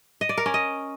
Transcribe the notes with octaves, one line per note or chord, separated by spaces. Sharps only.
D#5
D5
A#4
C#4
D#5